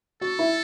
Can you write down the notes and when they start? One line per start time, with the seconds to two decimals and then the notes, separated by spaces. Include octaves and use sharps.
0.21 F#4 A4
0.39 E4